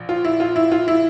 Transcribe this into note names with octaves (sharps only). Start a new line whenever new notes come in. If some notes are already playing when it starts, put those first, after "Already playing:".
Already playing: A#1
F4
E4
F4
E4
F4
E4